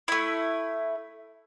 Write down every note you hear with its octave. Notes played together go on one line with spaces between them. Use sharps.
A3 E4